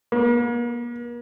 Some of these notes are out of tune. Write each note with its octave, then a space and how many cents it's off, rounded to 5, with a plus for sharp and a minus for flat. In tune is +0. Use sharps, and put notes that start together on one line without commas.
A#3 +45